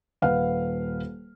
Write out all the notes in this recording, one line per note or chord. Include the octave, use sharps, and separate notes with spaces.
D#1 B4 F5 F#5 F6